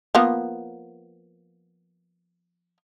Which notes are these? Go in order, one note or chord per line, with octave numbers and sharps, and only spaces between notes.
F3 A#3 B3